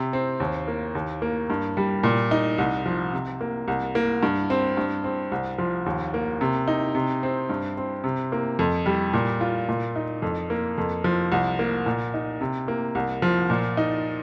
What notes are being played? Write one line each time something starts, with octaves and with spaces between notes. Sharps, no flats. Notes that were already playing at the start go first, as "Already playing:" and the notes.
Already playing: C3
C4
D#2
A#3
D#2
A#3
G2
G3
A#2
D#4
C2
F3
C3
A#3
C2
A#3
G2
C4
G2
C4
C2
F3
D#2
A#3
C3
D#4
C3
C4
G2
C4
C3
A#3
F2
G3
A#2
F4
A#2
D#4
F2
A#3
F2
F3
C2
A#3
A#2
D#4
C3
A#3
C2
F3
A#2
D#4